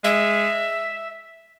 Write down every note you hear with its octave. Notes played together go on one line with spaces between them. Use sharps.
G#3 E5